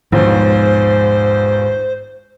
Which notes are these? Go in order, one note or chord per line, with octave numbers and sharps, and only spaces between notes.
A#1 D#2 G#2 B2 C5